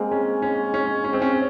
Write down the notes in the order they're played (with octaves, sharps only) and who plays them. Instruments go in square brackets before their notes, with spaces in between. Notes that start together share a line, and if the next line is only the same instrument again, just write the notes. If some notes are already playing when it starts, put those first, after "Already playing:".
Already playing: [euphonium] G#3 [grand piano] A#3 C4
[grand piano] C#4
C#4
C#4
C#4
C4
C#4